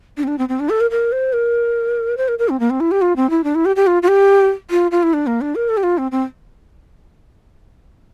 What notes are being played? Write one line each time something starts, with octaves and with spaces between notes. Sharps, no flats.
D4
C4
D4
C4
C4
D4
A4
A#4
A#4
C5
A#4
C5
A#4
A#4
C4
A#3
C4
E4
G4
F4
C4
E4
D4
E4
G4
G4
F4
F4
G4
F4
F4
E4
D4
A#3
D4
A#4
A4
G4
F4
C4
C4